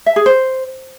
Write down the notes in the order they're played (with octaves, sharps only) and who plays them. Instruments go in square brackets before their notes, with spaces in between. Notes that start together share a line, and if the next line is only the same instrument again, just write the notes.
[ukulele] E5
G#4
C5